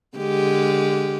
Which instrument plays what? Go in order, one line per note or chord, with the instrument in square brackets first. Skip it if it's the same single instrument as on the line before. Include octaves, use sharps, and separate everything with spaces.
[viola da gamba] D3 G#3 G4